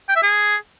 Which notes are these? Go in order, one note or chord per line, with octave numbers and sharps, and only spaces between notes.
G5
E5
G#4